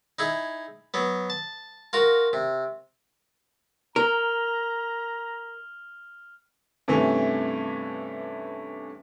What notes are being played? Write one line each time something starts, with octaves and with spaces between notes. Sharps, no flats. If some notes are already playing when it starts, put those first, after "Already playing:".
D#4 E4 G#4
F#3 B3
A5
F4 F#4 A#4
C3
A#4 A#5 F6 F7 G7
G2 C3 E3 A3 C#4